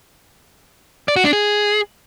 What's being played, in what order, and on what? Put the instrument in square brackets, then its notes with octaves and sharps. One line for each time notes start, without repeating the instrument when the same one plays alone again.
[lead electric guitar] D5
F#4
D4
G#4